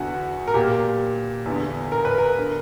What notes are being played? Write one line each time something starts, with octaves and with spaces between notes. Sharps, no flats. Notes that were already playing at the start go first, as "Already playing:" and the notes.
Already playing: E2 D3 F#4
A#4
A#2 G4
E2 D3
A#4
B4
A#4
D3